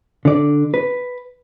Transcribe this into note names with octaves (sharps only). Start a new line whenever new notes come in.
D3 D5
B4